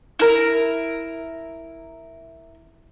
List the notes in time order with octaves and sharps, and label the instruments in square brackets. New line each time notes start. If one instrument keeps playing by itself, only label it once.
[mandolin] E4 A#4